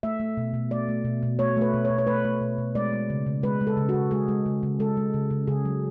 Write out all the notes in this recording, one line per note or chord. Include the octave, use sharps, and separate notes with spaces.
A3 E5
A3
B2
B2
A3 D5
A3
B2
B2
A3 C#5
A3 B4
B2
C#5
B2
C#5
A3 B4
A3
B2
B2
G#3 D5
G#3
C#3
C#3
G#3 B4
G#3
A4
C#3
F#4
C#3
G#3 G#4
G#3
C#3
C#3
G#3 A4
G#3
C#3
C#3
C#3 G#4
F#3